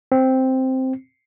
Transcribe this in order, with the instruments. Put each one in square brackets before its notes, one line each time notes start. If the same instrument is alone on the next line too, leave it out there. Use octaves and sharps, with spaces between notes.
[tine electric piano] C4